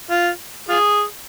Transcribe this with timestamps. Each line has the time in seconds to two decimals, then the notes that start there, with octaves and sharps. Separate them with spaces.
0.11 F4
0.69 F4 G#4